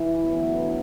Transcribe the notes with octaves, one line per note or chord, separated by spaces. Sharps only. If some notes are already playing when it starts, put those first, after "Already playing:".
Already playing: E3 E4
D2 D3 F#3 B3